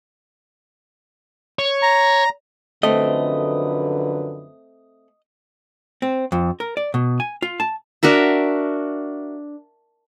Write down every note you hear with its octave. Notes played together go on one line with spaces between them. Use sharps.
C#5
A#5
F#2 D3 F3 A3 C4 B4 D#5
C4
F2
A#4
D5
B2
G#5
F4
A5
D4 F#4 A#4 E5